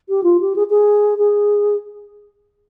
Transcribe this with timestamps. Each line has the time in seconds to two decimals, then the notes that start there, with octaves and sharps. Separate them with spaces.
0.09 G4
0.23 F4
0.40 G4
0.56 G#4
0.70 G#4
1.18 G#4